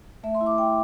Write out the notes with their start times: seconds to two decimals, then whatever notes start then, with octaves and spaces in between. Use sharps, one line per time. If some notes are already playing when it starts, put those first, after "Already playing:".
0.23 A3 E5
0.35 C6
0.41 E4
0.46 D6
0.58 A3 G5